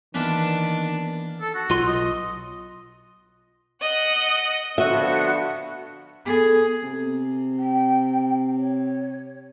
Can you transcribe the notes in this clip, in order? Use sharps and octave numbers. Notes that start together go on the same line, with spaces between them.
D#3 E3 A#3 B3 D4 F4
A4
F#4
B1 F4 C6
D#5
D#5 F#5
D3 F3 B3 F#4 E5
B3 G#4 A4
C3
G5
C#5